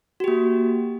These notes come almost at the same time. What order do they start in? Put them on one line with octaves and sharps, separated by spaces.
F#4 G4 A#3